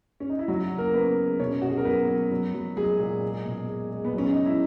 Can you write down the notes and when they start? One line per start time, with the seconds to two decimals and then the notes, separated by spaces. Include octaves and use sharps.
0.20 C#4
0.30 D#4
0.39 E4
0.48 C#3 F#3 F#4
0.71 C#3
0.78 A#3 A#4
0.94 C#3 B3 B4
1.17 G#3
1.39 B2 C#4 C#5
1.62 B2 F#4
1.70 G#4
1.77 A#4
1.85 F#3 B3 B4
2.08 F#3
2.31 F#3
2.54 F#3
2.77 F#3 G#3 G#4
3.00 A#2
3.23 G#3
3.45 B2
3.68 G#3
3.91 G#3
4.05 B3
4.14 F#3 C#4
4.32 C#3 D#4
4.46 E4